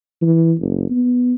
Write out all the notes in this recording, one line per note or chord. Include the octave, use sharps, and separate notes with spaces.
E3
F#1
B3